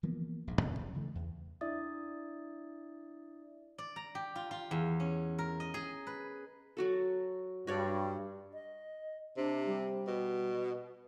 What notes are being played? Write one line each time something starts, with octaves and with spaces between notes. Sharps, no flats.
E3 F3 A#3 B3
D#1 A#1 G#2
F2 B2 C#4
F1 F#2 C#3
C#3 E3 F#3 A3
E2
D4 E4 D5 E5 D#6 A6
D5
A#5
G4
F4
F4
E2
C#4
A#4
D#5
G#4
B4
F#3 F#4 A4
G2 F#4 C#5 D5
D#5
C3 D4
G3
B2